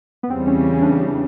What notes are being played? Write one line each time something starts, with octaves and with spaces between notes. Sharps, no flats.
B3
E2 C#3 E3 G3 C4
C#4
C#4
D4